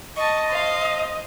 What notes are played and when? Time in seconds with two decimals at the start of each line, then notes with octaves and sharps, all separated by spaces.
0.17 D#5 A5 C#6
0.49 C5 F5